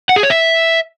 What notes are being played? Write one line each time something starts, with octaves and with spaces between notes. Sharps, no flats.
F#5
G#4
C#5
E5